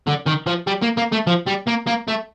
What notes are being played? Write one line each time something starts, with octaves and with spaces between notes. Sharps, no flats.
D3
D#3
F3
G3
A#3
A#3
A3
F3
G3
A#3
A#3
A3